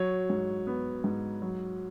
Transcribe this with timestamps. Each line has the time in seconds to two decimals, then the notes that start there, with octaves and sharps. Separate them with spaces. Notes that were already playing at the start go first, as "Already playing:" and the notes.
Already playing: F#3 C#5
0.30 G#2
0.67 B3
1.04 G#2
1.42 F#3